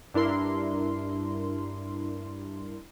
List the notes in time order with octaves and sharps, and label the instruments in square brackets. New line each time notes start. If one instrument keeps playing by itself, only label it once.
[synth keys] G2 D4 E4 A#4 C6